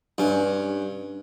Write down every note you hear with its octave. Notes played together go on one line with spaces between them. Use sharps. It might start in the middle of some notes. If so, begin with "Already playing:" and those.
G2 C#4